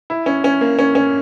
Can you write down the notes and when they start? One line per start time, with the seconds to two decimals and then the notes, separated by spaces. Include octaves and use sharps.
0.10 E4
0.26 C#4
0.44 C#4
0.61 A#3
0.79 C#4
0.95 C#4